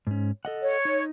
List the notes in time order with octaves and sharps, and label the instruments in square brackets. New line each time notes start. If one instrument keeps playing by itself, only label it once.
[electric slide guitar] G#2 C#4
A4 D#5 F#5
[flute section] C#5
[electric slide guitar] D#4